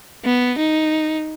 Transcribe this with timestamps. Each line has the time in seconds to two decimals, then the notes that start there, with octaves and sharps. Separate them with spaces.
0.25 B3
0.58 D#4